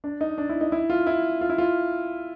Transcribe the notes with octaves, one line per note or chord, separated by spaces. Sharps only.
D4
D#4
D4
E4
D#4
E4
F4
E4
F4
E4
F4